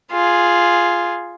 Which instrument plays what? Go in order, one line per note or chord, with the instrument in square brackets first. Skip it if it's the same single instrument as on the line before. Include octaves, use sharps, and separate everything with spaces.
[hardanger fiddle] F4 G#4